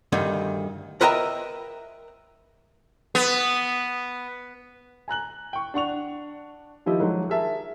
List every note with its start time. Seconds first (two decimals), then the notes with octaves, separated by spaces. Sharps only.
0.12 D2 G2 D#3
1.01 A#4 B4 D#5 E5 G5 A#5
3.15 B3
5.08 G#5 A#5 F#6 F#7
5.53 G5 C#6
5.74 D4 F#5 C#6 F7
6.86 D#3 F3 E4 G4 D#5
7.00 F3 F#3 G#3 D#4
7.30 G#4 A#4 E5 A5